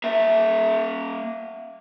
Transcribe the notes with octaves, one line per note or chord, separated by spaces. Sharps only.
A#3 E5